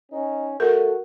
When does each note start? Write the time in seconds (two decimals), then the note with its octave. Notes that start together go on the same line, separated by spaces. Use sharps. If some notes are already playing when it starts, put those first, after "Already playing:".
0.12 C#4 D#4
0.60 A3 F#4 A#4